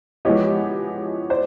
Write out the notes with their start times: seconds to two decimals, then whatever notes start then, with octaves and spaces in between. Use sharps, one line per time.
0.25 F3 G#3 B3 E4 G4 C#5 D#5
1.30 C5 D5